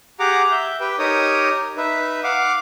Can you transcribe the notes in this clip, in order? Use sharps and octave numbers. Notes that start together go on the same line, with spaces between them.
G4 G#4 F#5 A#5 D6
E5 G6
G4 B4 G5
D#4 G4 A#4 C#5 D#6
D#4 B4 E5
F5 F#5 D6